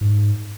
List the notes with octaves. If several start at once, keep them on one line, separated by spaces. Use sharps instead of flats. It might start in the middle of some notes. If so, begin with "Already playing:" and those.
G#2